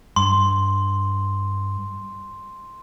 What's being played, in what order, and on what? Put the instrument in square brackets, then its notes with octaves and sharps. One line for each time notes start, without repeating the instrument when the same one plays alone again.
[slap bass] G2 [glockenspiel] C6